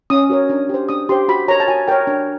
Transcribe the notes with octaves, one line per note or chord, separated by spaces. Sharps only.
C#4 D#6
F#4 A#4 C#5
D4
G4 C5
D4 D#6
G4 C5 C6
F#4 B5
A#4 C#5 A#5
A5
F#4 G#5
A#4 C#5 G5
D4